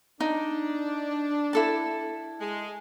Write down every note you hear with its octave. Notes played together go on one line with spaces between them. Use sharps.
D4 D#4
E4 A4 A5
G#3